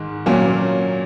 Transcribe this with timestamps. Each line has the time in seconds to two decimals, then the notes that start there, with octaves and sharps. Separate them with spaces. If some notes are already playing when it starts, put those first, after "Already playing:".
Already playing: G#2 D#3
0.26 A#2 F#3 A#3 C#4